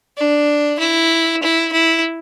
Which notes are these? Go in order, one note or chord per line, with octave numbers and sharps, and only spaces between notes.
D4
E4
E4
E4